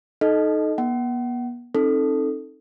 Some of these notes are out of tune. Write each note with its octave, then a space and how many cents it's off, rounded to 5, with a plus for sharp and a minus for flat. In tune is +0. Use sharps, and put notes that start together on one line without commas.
D#4 +0 A4 -25 D#5 +0
B3 -40 F#5 +35
C4 +45 D#4 +5 A4 +0